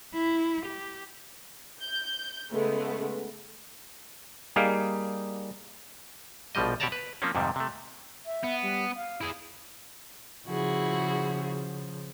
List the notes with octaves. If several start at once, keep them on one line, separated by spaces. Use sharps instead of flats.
E4
G4
G6
C#3 G#3 A3 B3
G3 A#3 D#4 G#4 F5
A#1 B2 F3 G3 D#5
B2 G4 C#5 D5 A5 A#5
B4
F3 A#3 C4 C#4
F2 G#2 C3 D#3 G3
C3 A3
E5
B3
G3
F5
E4 G#4
C#3 F3 E4 F#4 G#4